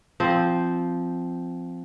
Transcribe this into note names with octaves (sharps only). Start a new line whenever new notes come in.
F3 C4